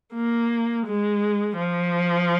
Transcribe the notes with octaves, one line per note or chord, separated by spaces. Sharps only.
A#3
G#3
F3